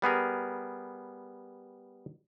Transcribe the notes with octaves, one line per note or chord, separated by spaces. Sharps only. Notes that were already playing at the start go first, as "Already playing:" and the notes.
G3 B3 G#4 A#4